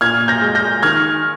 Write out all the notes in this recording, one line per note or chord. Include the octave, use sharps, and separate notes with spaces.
A#2 F6 G#6
G6 A#6
G#3
G6 A#6
D#3 F6 G#6